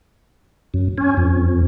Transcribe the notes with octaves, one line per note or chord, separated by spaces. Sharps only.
F#2
C#4
F2